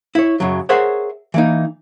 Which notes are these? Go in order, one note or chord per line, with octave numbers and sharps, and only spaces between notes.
E4 C#5
F#2 C#3 F#3
G#4 A#4 C5 C#5 E5 F#5
E3 A#3 D#4